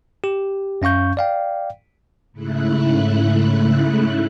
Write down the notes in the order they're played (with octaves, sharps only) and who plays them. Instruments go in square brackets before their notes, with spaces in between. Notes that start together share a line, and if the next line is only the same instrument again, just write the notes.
[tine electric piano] G4
F#2 C#4 F5 C#6 G6
D5 F5 G5
[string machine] G#2 C#3 A3 E4 F#6